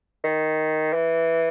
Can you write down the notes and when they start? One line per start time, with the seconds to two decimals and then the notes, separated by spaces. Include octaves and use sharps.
0.24 D#3
0.93 E3